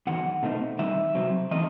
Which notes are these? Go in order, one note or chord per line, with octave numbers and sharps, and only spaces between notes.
E2 D#3 F#3 F#5
B2 A3 C4 D#4
D#3 G3 D#4 E5
C3 F#3 C4
E3 A3 C4 D#4 D#5